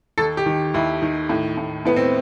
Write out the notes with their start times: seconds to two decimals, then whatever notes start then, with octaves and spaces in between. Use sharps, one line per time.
0.18 D#2 A4
0.37 G4
0.46 D#3
0.74 D#2 E4
1.02 D#3
1.29 A2
1.57 A2
1.85 A2 B3
1.96 C4